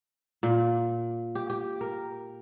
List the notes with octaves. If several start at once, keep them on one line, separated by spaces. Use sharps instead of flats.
A#2
G4
G4
A#4